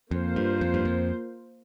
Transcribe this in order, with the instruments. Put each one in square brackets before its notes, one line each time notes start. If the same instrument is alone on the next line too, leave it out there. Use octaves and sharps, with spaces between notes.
[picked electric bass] F2 [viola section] A#3 F4 C5
[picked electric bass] G2
F2
G2
F2